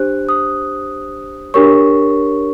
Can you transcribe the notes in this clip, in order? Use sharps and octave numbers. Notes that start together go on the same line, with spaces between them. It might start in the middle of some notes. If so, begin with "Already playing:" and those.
Already playing: D4 G4 C5 F#6
D#6
D4 G4 A#4 C#5 C#6